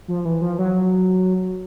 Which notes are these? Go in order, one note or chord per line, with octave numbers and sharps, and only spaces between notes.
F3
E3
F3
F#3